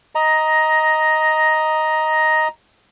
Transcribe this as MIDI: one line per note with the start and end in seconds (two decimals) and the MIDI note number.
0.15 2.48 75
0.15 2.48 82